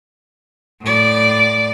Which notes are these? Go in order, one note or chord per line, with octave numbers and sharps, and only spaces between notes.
A2 D5